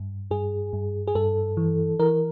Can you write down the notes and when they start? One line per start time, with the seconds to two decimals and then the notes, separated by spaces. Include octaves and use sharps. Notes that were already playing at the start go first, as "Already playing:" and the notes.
Already playing: G2
0.31 G2 G#4
0.73 G2
1.07 G#4
1.15 G2 A4
1.57 E3
1.99 E3 A#4